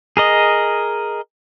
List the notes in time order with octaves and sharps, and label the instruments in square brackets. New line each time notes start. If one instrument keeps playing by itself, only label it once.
[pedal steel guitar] G#4 A#4 D#5